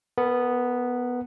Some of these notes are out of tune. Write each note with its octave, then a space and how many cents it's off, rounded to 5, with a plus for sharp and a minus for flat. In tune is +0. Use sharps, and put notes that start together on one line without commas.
B3 +0 A#4 -30